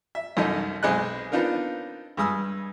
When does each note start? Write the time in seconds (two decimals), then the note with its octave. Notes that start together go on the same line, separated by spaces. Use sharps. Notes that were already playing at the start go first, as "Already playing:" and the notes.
0.15 E5
0.37 C2 F#2 D#4 A4 D#5
0.83 B1 G#3 C4 D#5 F#6
1.32 B3 C4 D4 D#4 F4 A#4
2.17 G2 G#3 D#6 E6